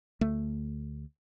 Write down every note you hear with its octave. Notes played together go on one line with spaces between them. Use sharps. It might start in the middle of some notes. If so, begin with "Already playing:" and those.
D2 A3